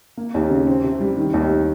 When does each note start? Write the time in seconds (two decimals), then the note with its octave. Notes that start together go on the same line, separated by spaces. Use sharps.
0.17 A#3
0.34 D#2
0.50 C#3
0.67 C4
0.84 C3
1.00 G3
1.17 D#3
1.34 D#2